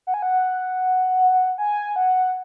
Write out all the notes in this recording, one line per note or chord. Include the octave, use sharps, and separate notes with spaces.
F#5
G#5
F#5
G#5
F#5